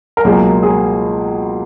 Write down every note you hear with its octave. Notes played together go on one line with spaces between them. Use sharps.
A#4
C#2 B2 F#3 A#3 G#4
G#4